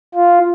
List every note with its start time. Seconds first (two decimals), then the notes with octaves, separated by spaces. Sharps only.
0.15 F4